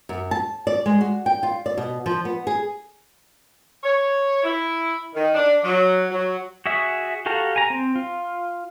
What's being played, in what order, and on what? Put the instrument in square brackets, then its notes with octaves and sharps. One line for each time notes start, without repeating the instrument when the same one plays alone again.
[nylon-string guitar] F#2
A5
D5
G#3
F#4
G5
F4
D5
B2
F3
B3
G#4
[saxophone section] C#5
E4
D#3
D4
F#3
F#3
[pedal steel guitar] F#4 G#4 E5
F#4 G4 A4 F5 A#5
G#5 A#5
C4
F4